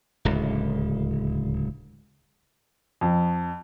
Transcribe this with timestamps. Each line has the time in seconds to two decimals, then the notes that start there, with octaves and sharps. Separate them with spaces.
0.25 D1 C#2
3.01 F2